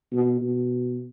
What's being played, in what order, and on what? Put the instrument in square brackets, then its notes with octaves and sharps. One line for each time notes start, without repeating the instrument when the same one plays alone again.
[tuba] B2
B2